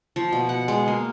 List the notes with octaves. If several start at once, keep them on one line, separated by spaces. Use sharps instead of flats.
F3
B2
F#5
G#3
A#3